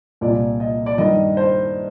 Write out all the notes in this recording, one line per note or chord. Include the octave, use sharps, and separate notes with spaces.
C2 A#2 D5
D#5
D5
G2 D#3 D#5
C5